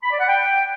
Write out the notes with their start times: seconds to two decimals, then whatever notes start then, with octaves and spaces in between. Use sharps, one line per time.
0.03 B5
0.11 D5
0.19 F#5
0.27 G5